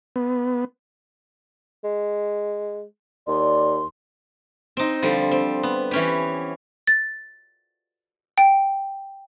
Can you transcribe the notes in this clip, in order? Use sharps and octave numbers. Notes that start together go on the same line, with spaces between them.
B3
G#3
D#2 D5 C6
C4 D#4
D3 F3 G3
C4
B3
E3 C#4 G4
A6
G5